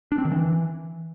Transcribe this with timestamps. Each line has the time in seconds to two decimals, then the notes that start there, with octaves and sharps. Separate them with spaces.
0.12 D4
0.18 C4
0.25 D#3
0.32 E3